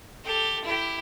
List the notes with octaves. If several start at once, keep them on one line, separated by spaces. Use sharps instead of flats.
G4 A4
E4 G4